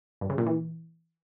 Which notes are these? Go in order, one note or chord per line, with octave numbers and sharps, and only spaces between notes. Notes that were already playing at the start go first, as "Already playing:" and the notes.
G2
C#3
A#2
E3